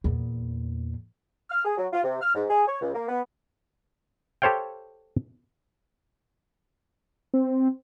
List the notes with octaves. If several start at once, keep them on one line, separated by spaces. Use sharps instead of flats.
E2 A#2
F6
G#4
F#3
F4
C3
F6
G#2
G#4
C#5
C#2
A#3
B3
G4 A4 C5 C#5 F5 G5
C4